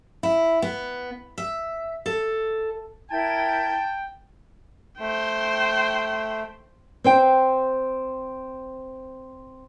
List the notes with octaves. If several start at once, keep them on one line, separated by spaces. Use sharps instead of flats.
E4
B3
E5
A4
E4 A#4 G5 A5 G#6
A3 C5 G5
C4 C5 G5